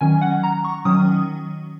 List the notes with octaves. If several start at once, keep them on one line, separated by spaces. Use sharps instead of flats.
D#3 F#3 C#4 G#5
F#5
A#5
C#6
D#3 F#3 C#4 D#6